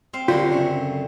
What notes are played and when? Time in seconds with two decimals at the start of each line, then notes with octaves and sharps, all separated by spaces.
0.13 C4 F5
0.28 D3 F#3 G3 F4 A#4
0.52 F#2 C#3 A3